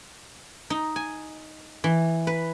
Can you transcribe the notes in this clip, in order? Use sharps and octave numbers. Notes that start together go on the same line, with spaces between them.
D#4
G#5
E3
B4